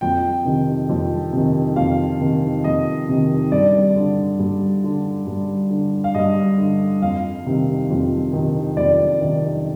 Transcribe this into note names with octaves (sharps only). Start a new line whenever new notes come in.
F2 G5
C3 D#3
F2
C3 D#3
F2 F5
C3 D#3
F2 D#5
C3 D#3
G2 D5
D3
G2
D3
G2
D3
F5
G2 D#5
D3
F2 F5
C3 D#3
F2
C3 D#3
F2 D5
C3 D#3